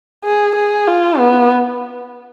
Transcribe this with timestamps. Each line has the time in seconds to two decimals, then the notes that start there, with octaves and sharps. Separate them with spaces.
0.24 G#4
0.56 G#4
0.88 F4
1.18 B3